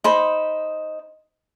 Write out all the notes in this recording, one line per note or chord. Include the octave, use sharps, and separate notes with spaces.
D#4 C5 B5